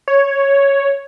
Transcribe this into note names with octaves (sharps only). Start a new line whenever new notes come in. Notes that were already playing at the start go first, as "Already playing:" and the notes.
C#5